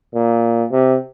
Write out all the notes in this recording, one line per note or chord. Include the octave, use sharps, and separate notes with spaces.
A#2
C3